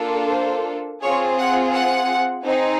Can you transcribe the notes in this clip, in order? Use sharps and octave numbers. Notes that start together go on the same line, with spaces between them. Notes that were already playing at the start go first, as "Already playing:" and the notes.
Already playing: A#3 D4 F4 A4
C5
C4 F4 G#4 C#5
F#5
F#5
C4 D#4 G#4